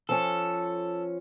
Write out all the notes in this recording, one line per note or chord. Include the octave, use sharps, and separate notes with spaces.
F3 C#4 A4